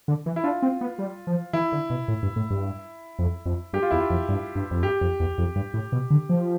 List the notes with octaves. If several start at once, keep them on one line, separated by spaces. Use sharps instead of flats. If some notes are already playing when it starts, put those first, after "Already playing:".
D3
E3
E4
D4 F4
C4
B3
G3
F3
E3 E4
D3
B2
A2
G2
A2
G2
F2
F2
G2 G4
F4
E2 E4
F4
F2
G2
G2
F2
G2 G4
F2
E2
F2
G2
A2
B2
D3
F3